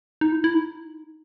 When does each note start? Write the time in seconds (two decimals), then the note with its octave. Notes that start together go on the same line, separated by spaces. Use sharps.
0.21 D#4
0.32 E4
0.44 E4
0.54 D#4